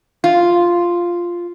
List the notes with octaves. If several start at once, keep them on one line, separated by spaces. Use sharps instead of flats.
F4